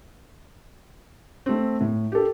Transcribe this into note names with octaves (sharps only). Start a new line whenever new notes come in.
A3 C4
A2
G4 A4